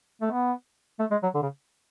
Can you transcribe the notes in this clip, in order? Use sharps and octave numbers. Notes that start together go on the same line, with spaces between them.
A3
B3
A3
G#3
F#3
D3
C#3